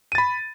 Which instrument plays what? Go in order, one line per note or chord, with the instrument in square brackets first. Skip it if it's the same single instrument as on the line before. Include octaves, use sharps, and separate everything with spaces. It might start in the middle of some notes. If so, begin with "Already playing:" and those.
[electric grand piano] D#7
A6
B5